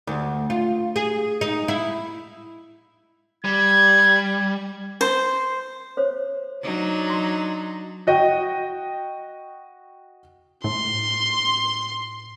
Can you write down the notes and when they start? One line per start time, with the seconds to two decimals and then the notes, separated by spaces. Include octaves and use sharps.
0.07 D2
0.50 F4
0.96 G#4
1.41 D#4
1.68 E4
3.45 G3 G#6
5.01 C5
5.97 C5 C#5
6.63 F#3 D4 D#4
7.10 C6
8.07 F#4 D#5 G5
10.64 A2 C6